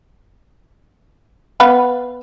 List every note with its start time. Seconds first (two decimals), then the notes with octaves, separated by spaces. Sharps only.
1.60 B3 B4 F5